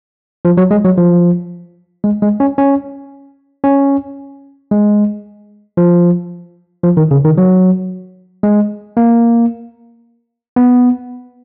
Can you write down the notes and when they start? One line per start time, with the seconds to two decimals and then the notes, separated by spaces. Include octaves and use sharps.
0.45 F3
0.57 F#3
0.71 G#3
0.84 F#3
0.98 F3
2.04 G#3
2.22 G#3
2.40 C#4
2.58 C#4
3.64 C#4
4.71 G#3
5.77 F3
6.83 F3
6.97 D#3
7.11 C#3
7.24 D#3
7.38 F#3
8.43 G#3
8.97 A#3
10.56 B3